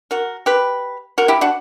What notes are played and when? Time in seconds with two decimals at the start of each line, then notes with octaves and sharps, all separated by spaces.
0.11 F#4 A#4
0.46 G4 B4
1.18 F#4 A#4
1.28 E4 G4
1.41 D4 F#4